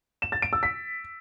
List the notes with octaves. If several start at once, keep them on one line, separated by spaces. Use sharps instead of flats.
E7
A6
D7
E6
B6